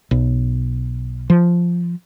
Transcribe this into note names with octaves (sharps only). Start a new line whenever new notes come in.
B1
F3